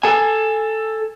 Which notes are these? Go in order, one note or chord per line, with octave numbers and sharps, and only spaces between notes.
A4 G#5